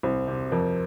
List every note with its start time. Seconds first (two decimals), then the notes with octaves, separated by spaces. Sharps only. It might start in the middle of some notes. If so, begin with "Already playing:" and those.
0.03 C2 C5
0.27 C3
0.52 F2 A#4